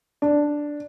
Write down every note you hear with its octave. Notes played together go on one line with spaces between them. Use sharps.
D4